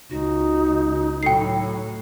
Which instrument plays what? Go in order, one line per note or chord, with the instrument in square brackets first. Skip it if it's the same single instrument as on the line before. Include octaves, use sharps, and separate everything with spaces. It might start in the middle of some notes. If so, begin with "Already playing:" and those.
[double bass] C#2 C#3 [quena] D#4 [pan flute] F#4
[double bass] A2 F#3 [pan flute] A4 [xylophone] G5 C7